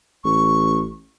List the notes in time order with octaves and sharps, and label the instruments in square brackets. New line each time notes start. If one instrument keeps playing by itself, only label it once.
[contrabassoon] A1 [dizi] C#6